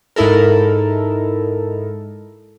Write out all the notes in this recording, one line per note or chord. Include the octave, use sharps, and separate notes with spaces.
G#2 D#4 E4 A4 A#4